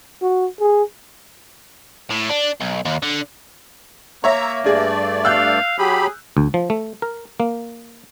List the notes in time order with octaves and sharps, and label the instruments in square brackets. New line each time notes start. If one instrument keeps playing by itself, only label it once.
[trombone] F#4
G#4
[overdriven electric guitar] A2
D4
B1
D#2
D3
[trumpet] A#3 [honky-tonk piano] C#5 E5 [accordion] A#5
[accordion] G2 A3 D5 [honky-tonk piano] D4 G#4
[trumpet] F5 [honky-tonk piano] E6 F#6 G6
[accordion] F#3 G4 B5 [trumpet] G#4
[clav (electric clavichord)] D2
F3
A3
A#4
A#3